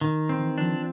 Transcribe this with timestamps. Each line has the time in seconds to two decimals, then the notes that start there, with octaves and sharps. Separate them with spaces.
0.01 D#3
0.29 C4
0.38 E3
0.58 F3 D4